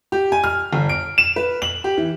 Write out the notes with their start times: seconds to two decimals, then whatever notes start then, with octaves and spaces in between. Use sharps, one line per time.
0.12 G4
0.32 G#5
0.44 F6
0.73 G1
0.89 D7
1.18 E7
1.36 B4
1.62 F#7
1.84 G4
1.97 E3